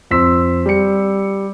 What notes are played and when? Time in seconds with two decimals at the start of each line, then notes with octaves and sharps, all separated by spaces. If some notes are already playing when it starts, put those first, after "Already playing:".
0.11 F2 C5 C6 E6 B6
0.66 G3 C#7